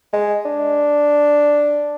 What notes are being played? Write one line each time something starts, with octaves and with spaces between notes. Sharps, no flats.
G#3
D4